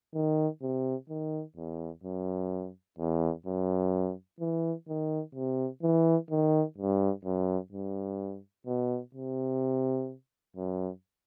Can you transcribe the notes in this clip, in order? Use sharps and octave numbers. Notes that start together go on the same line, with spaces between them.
D#3
C3
D#3
E2
F#2
E2
F#2
E3
D#3
C3
E3
D#3
G2
F#2
G2
B2
C3
F#2